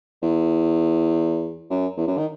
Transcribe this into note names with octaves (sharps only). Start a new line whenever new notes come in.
E2
F#2
E2
F#2
D#3